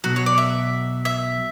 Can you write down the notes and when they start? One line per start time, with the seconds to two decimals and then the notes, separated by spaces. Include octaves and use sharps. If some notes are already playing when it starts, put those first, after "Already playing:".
0.04 B1 B2 F#3 F#4
0.16 C#5
0.26 D5
0.38 E5
1.05 E5